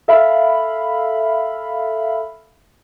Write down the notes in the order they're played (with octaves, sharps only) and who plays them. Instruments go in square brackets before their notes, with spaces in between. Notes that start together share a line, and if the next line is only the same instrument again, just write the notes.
[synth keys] A4 E5 F5 B5